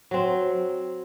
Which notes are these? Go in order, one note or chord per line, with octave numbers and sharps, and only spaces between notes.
F#3 C4